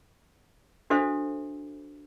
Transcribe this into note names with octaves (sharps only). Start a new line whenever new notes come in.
D4 F#4 A4 C5 E5